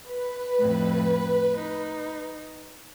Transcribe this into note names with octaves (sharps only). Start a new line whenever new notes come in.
B4
F2 A2
D#4